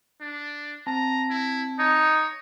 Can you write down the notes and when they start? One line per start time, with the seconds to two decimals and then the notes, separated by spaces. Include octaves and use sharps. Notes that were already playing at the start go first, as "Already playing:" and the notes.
0.21 D4
0.87 C4 A5 A#5
1.30 E4
1.79 D#4 C#5